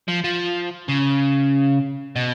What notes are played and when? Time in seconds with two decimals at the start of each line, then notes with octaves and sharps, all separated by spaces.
0.08 F3
0.24 F3
0.88 C#3
2.16 B2